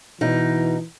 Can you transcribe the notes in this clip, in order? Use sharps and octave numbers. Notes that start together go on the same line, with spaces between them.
B2 E3 D#4